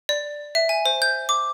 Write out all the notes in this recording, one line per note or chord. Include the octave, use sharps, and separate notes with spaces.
D5
E5
G#5
C5
G6
D6